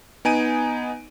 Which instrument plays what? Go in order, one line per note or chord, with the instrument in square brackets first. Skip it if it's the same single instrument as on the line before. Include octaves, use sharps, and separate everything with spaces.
[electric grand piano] B3 D#4 G#5 D7 D#7